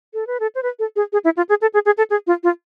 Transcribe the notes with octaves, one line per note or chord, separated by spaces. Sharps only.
A4
B4
A4
C5
B4
A4
G#4
G#4
E4
F4
G#4
A4
G#4
G#4
A4
G#4
F4
F4